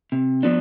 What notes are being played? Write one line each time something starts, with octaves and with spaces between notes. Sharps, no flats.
C3
F3 B3 D4